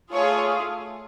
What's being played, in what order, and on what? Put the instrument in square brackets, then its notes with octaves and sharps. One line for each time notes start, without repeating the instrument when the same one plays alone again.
[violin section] A3 F4 G#4 C#5